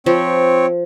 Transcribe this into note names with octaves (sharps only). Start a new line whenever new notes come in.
F3 C4 C#5